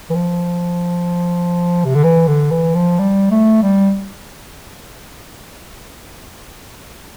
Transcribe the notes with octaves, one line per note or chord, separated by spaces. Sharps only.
E3
F3
C3
D3
E3
D3
E3
F3
G3
A3
G3